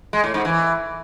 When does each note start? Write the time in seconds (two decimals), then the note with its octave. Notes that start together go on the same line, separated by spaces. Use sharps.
0.13 G#3
0.24 A2
0.34 G#2
0.45 E3